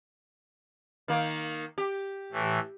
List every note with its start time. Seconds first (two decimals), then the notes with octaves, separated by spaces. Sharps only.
1.08 D#3 A#3
1.78 G4
2.32 A2 E3